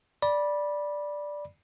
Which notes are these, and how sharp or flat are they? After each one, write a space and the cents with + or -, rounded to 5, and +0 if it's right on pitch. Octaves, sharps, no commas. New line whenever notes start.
D5 +0 B5 -20